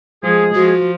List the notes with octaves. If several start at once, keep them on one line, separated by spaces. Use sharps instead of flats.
F3 G#3 G#4
F3 F#4